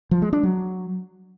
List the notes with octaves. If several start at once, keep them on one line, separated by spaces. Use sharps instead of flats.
F3
G#3
D4
F#3